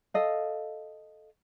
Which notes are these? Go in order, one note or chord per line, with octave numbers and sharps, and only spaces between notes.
A4 D#5 F5